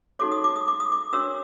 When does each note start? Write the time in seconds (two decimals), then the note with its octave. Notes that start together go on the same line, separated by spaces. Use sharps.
0.19 D#4 F#4 A4 C#5 D6
0.32 D#6
0.44 D6
0.56 D#6
0.68 D6
0.80 D#6
0.92 D6
1.13 D4 F#4 A#4 C#5 E6